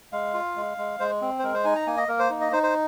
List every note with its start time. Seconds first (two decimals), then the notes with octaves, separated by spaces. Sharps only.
0.12 G#3 F5
0.34 F4
0.56 G#3
0.78 G#3
1.00 G#3 C5
1.22 C4
1.39 C5
1.43 G#3 A#4
1.54 C5
1.65 D#4 G#5
1.76 A#5
1.87 A#3 G#5
1.97 D#5
2.08 A#3 A#4
2.19 C5
2.30 D#4
2.41 D#5
2.52 D#4 C5
2.63 C5